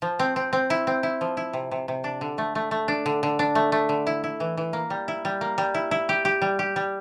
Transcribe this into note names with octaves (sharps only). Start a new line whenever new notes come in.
F3
C4
C4
C4
E4
C4
E4
F3
E4
C3
C3
C3
D4
D3
A3
A3
A3
D4
D3
D3
D4
A3
A3
D3
E4
E4
E3
E3
A#3
G3
E4
G3
A#3
G3
E4
E4
G4
G4
G3
G4
G3